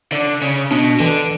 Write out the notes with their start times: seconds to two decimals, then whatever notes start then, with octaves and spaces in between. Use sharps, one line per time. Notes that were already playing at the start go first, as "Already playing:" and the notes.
0.12 D3
0.42 C#3
0.71 B2 D4
1.00 D3 E3